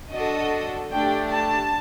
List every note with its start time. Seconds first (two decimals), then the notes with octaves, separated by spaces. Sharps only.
0.11 D4 F#4 A4 D#5
0.90 A3 D4 G4 G5
1.30 A5